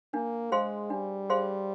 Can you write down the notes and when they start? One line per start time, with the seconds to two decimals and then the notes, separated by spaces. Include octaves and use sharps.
0.14 A#3 D4
0.52 G#3 G#4 C5 F5 C6
0.90 G3 D4
1.30 G#4 C5 F5 C6